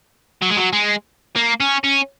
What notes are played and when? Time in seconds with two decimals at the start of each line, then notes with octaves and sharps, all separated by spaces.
0.42 F#3
0.50 G#3
0.57 F#3
0.73 G#3
1.36 A#3
1.60 C#4
1.84 C#4